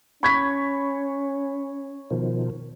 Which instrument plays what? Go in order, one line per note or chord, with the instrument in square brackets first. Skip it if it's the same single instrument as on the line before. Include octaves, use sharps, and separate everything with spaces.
[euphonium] C#4 [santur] C#5 [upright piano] B5 G#6 B6
[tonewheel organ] B2 D#3 F3